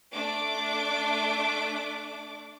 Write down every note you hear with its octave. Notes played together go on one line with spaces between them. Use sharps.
A3 D4 D6